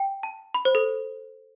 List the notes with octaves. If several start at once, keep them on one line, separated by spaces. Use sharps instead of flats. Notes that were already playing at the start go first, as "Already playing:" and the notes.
Already playing: G5
A5
B5
C5
A4